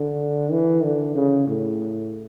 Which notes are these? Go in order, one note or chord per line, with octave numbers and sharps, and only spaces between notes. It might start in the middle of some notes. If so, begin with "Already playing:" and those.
Already playing: D3
E3
D3
C#3
A2